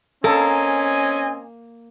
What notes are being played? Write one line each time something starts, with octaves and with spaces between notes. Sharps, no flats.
A#3 C4 C#4 A4 D#5 G#5